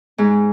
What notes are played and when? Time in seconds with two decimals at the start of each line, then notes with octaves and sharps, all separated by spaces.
0.18 G#2